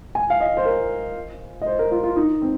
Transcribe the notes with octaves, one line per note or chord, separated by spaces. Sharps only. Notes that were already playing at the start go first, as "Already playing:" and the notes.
G#5
F5
D#5
C5
A#4
D#5
C5
A#4
F4
F4
D#4
C4